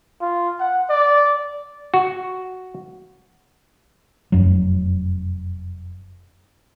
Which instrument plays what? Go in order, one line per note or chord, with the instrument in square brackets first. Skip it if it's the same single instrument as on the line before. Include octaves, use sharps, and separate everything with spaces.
[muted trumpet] F4
F#5
D5
[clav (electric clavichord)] F#4
[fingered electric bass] F1 F#2 F#3